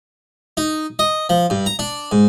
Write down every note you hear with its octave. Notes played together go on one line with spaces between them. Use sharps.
D#4
D#5
F3
G2
A#5
D4
G#2